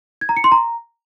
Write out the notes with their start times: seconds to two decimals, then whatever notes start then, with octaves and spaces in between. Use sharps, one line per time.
0.21 G#6
0.29 A#5
0.37 C#7
0.44 C6
0.52 A#5